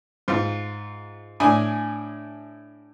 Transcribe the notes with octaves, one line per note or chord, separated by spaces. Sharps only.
G#2 F4
A2 D4 G#5 D#6